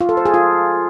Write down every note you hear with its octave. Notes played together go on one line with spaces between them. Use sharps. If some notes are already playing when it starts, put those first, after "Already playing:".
F4
A4
C5
G#4
F4